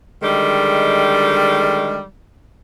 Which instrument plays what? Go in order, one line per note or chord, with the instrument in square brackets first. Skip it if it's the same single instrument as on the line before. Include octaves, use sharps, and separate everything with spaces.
[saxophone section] D3 D#3 G3 G#3